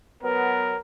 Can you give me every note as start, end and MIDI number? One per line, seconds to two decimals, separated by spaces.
0.23 0.74 54
0.23 0.74 59
0.23 0.78 70